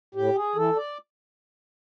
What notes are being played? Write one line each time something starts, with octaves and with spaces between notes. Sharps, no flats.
A2 G4
G#4
E3 A4
D5